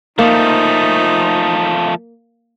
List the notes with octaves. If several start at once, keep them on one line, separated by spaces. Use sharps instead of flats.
F3 A3 A#3 D#4